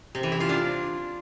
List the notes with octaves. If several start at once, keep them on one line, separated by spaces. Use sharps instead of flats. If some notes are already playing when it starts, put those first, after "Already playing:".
C3
E3
E4
F4
D4